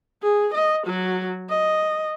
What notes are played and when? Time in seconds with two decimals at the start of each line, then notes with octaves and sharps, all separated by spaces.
0.23 G#4
0.54 D#5
0.86 F#3 F#4
1.50 D#5